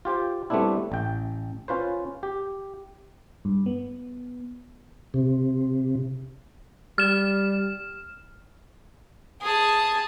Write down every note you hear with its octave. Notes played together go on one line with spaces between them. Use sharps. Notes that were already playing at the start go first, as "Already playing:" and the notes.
F4 G4 C5 G5
G3 A3 B3 C4 D4 E4
A1 G5
C#4 F4 B4 C5
G4
G2
B3
C3
G3 F6 E7
G#4 A5